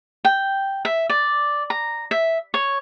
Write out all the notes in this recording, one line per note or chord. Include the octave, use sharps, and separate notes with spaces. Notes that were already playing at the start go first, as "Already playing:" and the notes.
G5
E5
D5
A#5
E5
C#5